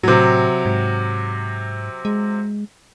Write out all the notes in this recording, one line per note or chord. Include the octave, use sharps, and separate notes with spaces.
A2 C3 F#3
G#2
G#3